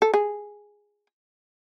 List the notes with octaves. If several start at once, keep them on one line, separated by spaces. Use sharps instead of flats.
A4
G#4